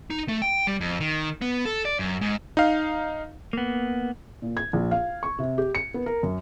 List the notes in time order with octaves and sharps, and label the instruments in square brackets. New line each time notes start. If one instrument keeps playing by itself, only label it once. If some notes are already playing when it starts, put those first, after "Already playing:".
[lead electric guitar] D#4
A3
G5
G3
F2
D#3
B3
A4
D5
F#2
G#2
[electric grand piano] D#4 F5
[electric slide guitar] A#3 B3
[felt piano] A#2
G#6
A#1
F5
C#6
C3
G4
C#7
B3
A#4
F#2